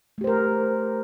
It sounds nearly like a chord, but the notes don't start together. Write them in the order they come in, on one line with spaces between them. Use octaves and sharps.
A3 G4 C5 A#4